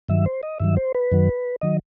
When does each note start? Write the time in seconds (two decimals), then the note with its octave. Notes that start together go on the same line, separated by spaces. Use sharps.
0.09 G2 D#3 F#3 E5
0.26 C5
0.43 D#5
0.60 G2 D#3 F#3 E5
0.77 C5
0.95 B4
1.12 F#2 D#3 F#3
1.61 D#3 F#3 D#5